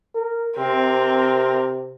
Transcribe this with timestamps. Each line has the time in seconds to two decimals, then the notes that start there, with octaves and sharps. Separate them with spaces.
0.15 A#4
0.57 C3 C4 A#4